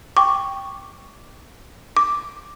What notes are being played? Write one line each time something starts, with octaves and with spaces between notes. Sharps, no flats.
G5 C#6 D6
D6